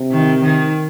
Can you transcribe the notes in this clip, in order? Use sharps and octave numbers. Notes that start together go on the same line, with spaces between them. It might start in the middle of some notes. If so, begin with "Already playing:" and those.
Already playing: C3
D#3
D#3